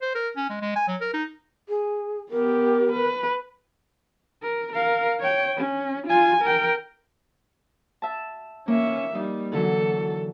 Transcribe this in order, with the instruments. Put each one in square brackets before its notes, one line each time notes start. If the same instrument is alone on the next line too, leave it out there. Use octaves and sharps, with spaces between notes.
[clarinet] C5
A#4
C#4
G#3
G#3
G#5
F#3
A#4
D#4
[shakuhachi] G#4
[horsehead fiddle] B3 G4 [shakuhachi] A#4
[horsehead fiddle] B4
A#4
A#4 F5
C#5 G5
C#4
F4 G#5
A#4 G5
[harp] E5 A5
[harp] A#3 [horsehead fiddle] C#4 E5
[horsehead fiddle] G3 [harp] D#4
[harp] D3 E3 F#3 [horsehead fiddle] A4